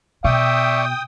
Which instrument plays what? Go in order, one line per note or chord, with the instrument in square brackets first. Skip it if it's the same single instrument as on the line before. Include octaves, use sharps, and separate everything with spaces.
[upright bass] B2 [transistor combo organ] D5 C#6 [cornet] E5 [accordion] G5 D#6